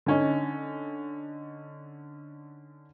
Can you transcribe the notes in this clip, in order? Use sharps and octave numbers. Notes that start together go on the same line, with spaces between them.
D3 C#4 D#4